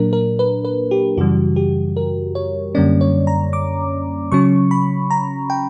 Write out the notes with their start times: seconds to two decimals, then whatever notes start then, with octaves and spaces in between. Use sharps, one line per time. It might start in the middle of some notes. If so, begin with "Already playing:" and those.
Already playing: A#2 F#3 A#3 D4 A#4
0.13 A#4
0.39 B4
0.65 B4
0.91 G4
1.17 F#2 C#3 E3 G3 F#4
1.56 G4
1.97 A#4
2.35 C#5
2.75 F#2 D3 G3 A#3 C#4 D5
3.01 C#5
3.27 A#5
3.53 D6
4.32 C#3 F#3 C#4 C#6
4.71 B5
5.11 A#5
5.50 G5